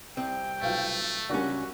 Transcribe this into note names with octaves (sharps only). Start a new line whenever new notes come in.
C2 C4 G5
B1 F#3 A3 F4
C#2 G3 A#3 C#4 D4 F#4